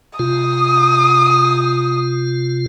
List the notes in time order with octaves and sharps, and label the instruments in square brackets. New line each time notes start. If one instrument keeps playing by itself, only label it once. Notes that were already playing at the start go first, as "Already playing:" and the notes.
[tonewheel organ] C3 F4 [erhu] D#6